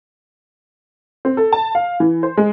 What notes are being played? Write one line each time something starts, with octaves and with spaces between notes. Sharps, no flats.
C4
A4
A5
F5
E3
C5
G#3